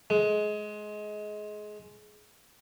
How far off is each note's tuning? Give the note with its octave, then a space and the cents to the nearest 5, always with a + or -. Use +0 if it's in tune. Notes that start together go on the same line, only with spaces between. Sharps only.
G#3 +20